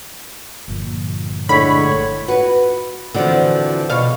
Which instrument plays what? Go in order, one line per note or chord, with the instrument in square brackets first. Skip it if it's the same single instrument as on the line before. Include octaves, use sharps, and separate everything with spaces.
[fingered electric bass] G1 A#2 F3
[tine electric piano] A2 D3 G#3 [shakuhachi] C#5 [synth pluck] B5
[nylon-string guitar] F#4 B4
[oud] D3 E3 F3 [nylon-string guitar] C4 F#4 D5
[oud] B2 C#5 F5